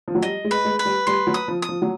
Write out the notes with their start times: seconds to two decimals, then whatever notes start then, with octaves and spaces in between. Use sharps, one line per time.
0.08 F3
0.15 F#3
0.23 G3 D#5
0.44 G#3
0.51 B4
0.65 G#3
0.79 B4
0.85 G3
1.07 G3 C6
1.27 F#3
1.34 D#6
1.48 F3
1.62 D#6
1.69 F3
1.82 F#3